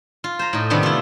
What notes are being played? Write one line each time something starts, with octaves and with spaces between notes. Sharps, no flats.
F4
C5 A#5
A2 D#4
C3 D#3 G3 A3 B3 D4
E4 F4